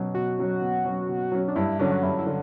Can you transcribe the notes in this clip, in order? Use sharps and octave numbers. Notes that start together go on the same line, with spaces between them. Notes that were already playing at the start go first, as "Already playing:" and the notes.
Already playing: B2 F#3 C#4
B2 F#4
F#3 C#4
B2
F#3 C#4
B2
F#3 C#4
D4
G2 E4
D3 F#3 C#4 D4
F#4
G2 E4
E4
D3